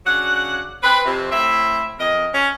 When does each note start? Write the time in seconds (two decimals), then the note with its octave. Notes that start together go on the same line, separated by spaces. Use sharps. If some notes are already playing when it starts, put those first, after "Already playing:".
0.06 C#3 F#3 D4 F#5
0.82 C4 B4
1.05 F2 C3
1.31 A2 C4 E4 E5
1.99 F2 A#4 D#5
2.34 C#4